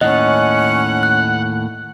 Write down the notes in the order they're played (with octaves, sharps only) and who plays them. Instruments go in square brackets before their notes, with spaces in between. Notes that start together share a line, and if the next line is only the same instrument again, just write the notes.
[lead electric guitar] D#2 A2 [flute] C#4 [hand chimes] D#5 [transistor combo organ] F#5
[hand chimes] F#6